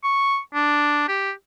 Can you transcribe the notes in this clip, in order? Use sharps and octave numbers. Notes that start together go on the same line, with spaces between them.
C#6
D4
G4